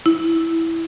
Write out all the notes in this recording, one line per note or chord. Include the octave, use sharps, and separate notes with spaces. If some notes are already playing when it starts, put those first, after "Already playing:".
E4